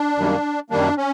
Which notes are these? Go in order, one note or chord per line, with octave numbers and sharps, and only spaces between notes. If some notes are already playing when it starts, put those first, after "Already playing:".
Already playing: D4
F#2 D#3 G3 A#3
F#2 D#3 G3 A#3 D4
C#4